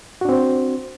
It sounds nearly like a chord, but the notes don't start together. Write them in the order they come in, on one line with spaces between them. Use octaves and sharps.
F#4 D4 C4 C5